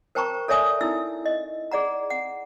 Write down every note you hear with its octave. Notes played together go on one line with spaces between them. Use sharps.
A#4 C5 G5 A5 A#5 C#6
A4 C#5 D5 E5 G#5 D#6
D#4 E4 E6
D#5
G#4 D5 F#5 A#5
F#5